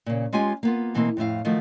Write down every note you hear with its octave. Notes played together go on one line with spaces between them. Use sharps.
A#2 C#3
G#3 C#4 F4 G4 G#5
A#3 B3 F4
B2 E3 A3 A#3 C4
F2 A2 E4 F5
D#3 F3 F#3 A3